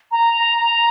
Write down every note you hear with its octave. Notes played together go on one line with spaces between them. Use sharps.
A#5